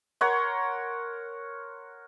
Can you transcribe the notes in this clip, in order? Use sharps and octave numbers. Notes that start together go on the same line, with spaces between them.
A#4 C#5 F#5 C6